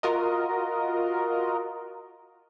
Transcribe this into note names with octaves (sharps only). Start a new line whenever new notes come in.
F4 F#4 A#4 D#5